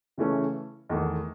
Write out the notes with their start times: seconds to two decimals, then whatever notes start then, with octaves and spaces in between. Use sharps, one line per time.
0.18 C#3 E3 A3 C#4
0.89 E2 D#3 A3